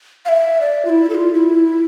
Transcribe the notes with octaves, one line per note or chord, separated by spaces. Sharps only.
F5
E5
D5
F4
E4
A4
F4
E4